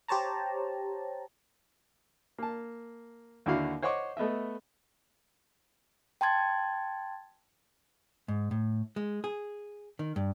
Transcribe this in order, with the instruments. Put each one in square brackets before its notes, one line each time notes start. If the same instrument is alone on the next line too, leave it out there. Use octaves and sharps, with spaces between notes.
[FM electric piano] G4 C5 C#5 A5 A#5
[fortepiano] A#3 A5
D#2 D3 E4 F#4 F5
C5 C#5 D#5 F#5 C#6 D6
A3 B3 D#5 E5
[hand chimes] G5 A5 C6 G#6 A6
[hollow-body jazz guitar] G#2
A2
G#3
G#4
D#3
G2